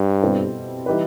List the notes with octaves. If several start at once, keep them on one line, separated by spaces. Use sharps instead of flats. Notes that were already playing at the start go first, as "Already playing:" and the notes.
Already playing: G2
B2 G3 C4 E4 A4
E3 G3 D#4 G4 B4